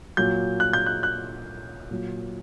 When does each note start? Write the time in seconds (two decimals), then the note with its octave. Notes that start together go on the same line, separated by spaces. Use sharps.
0.17 A#2 F#3 G6
0.60 F#6
0.73 G6
0.86 F#6
1.03 F#6
1.91 A#2 F#3